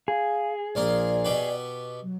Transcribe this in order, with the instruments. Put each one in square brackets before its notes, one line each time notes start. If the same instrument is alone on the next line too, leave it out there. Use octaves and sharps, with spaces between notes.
[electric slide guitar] G#4 [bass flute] F5
[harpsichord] A#1 A#3 F4 [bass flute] D5
[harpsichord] B2 G4 B4
[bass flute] F#3